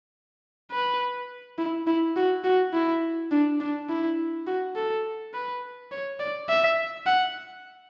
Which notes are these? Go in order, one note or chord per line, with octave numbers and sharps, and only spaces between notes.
B4
E4
E4
F#4
F#4
E4
D4
D4
E4
F#4
A4
B4
C#5
D5
E5
F#5